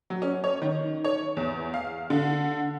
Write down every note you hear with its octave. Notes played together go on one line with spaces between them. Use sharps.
F#3
C#4
C#5
D#3
C#5
E2
F5
D3